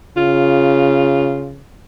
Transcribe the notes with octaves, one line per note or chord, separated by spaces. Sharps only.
C#3 F4